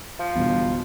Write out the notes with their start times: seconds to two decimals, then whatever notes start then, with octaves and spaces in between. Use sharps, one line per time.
0.20 F3
0.36 G1 E2 B2